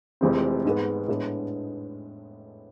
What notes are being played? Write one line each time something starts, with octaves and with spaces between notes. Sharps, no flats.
F1 F2 E3 G#3 C4
G#2 G#3 B3
A2 G#3 B3 D4